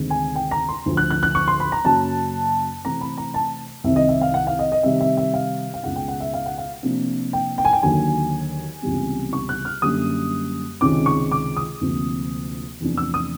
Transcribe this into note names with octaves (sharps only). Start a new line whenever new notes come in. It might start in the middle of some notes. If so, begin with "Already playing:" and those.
Already playing: D2 C3 D#3 G#3 C4
G#5
G5
A#5
C6
D2 D3 F3
F#6
F#6
F#6
C#6
C6
B5
A#5
F#2 C#3 F#3 A#3 C#4 A5
C3 E3 A3 C4 A#5
B5
A#5
A5
C2 C3 D#3 E5
D#5
E5
F5
F#5
F5
D#5
D#5
C3 D#3 G3 E5
E5
E5
F5
F5
C#2 B2 G#3 F#5
G5
F#5
E5
F5
F#5
F5
C3 F3 A#3 D4
G5
G5
G#5
G5
D#2 D3 F#3 G#5
C#2 C3 E3 G3 B3
C#6
F#6
F6
F#2 D3 G3 A#3 D#6
C#2 C3 D#3 G#3 C#4 D6
C#6
D6
D#6
D2 C3 F3 A#3
E2 C3 F3 A3 D4
E6
D#6